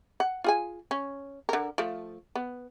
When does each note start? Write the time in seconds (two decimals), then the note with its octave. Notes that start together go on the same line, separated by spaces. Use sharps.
0.20 F#5
0.44 F4 G#4 G#5
0.91 C#4
1.49 D3 A#4
1.78 F3 A3
2.36 B3